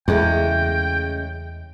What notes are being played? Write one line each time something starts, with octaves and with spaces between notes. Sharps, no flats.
E2 C#3 G#3 A3 G5